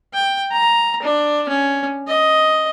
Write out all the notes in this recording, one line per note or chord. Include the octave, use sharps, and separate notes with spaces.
G5
A#5
D4
C#4
D#5